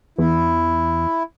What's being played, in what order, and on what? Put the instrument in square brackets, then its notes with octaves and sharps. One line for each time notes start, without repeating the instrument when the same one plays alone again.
[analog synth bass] E2 [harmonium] E4